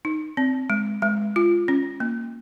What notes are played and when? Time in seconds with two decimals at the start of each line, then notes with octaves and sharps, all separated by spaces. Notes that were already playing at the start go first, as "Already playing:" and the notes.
0.05 D#4
0.37 C4
0.70 G#3
1.02 G#3
1.36 F4
1.68 C#4
2.00 A#3